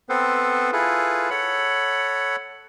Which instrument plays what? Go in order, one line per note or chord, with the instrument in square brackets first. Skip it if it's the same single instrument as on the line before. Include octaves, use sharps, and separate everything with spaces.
[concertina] B3 C4 A4 B4 C5
E4 F4 G#4 A4 B4
A4 C#5 F#5 B5